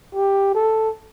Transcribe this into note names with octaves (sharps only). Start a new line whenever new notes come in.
G4
A4